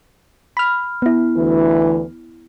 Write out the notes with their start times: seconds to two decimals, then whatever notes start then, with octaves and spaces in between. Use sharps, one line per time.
0.57 B5 F6
1.02 B3 E4
1.36 D2 E3